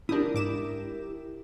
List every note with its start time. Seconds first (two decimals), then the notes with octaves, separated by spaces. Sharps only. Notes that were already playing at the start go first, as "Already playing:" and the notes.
0.09 D4 E4 G4 A#4 D#6
0.34 G#2 D6 E7